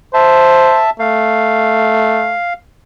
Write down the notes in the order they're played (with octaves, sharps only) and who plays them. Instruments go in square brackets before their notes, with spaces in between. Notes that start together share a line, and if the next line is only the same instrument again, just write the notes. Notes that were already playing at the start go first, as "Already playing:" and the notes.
[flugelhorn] C5 [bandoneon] E5 A5
[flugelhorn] A3 [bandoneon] F5